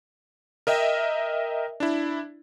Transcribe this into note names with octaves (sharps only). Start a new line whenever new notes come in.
A#4 D#5 E5 G5
D4 E4